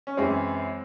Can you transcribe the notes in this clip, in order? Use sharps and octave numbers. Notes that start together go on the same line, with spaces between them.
C#4
F#2 E3 G#3 C4